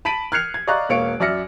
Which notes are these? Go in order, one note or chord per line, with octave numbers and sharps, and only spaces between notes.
A5 B5 B6 D7 D#7 F#7
F6 F#6 G#6 C7 C#7 F7
G#6
D5 D#5 F5 A#5 C#6 F#6
E1 A#3 C#5 F5 C#7 D7
F#2 D5 E5 F6 A#6 C#7